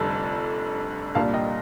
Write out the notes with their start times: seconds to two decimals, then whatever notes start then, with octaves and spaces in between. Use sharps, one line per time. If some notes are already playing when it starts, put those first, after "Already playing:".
Already playing: F1 F2 D3 G3 A5
1.15 C2 A#2 G3 A#3 D4 F5 A5
1.33 D#5 G5